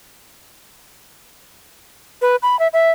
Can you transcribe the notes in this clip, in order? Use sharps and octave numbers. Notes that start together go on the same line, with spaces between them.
B4
B5
E5
E5